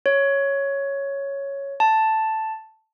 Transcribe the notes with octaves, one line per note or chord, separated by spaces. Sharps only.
C#5
A5